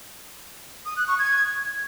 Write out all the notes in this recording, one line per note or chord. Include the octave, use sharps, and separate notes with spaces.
D#6
F#6
C#6
G#6